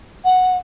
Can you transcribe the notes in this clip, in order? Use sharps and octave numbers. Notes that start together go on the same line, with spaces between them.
F#5